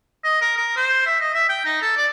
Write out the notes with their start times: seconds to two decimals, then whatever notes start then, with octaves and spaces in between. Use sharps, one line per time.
0.24 D#5
0.41 A#4
0.57 A#4
0.77 C5
1.06 E5
1.20 D#5
1.34 E5
1.49 G5
1.65 D#4
1.82 A4
1.97 D5